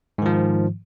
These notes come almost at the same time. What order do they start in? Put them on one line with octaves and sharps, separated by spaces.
G#2 D#3 F3